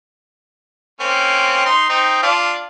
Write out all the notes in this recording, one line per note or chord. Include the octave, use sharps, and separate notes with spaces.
A#3 C4 C#4
D#4 C6
C4 D#4
D4 F4